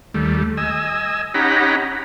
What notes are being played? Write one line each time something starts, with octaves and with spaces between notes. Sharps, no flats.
D#2 G3 A3
D#5 G#5 E6
C#4 D#4 G4 F#5 A#5 B5